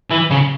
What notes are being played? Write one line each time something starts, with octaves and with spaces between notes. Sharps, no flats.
E3
C#3